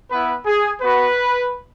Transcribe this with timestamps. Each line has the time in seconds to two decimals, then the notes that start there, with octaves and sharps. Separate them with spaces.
0.10 B3 E4 B4
0.46 G#4
0.81 B3 F#4 B4